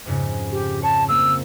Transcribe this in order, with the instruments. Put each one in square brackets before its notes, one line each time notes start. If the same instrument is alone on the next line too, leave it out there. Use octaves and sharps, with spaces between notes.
[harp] F2 G#2 C#3
[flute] G4
[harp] C#5 [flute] A5
[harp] A#3 C4 [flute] E6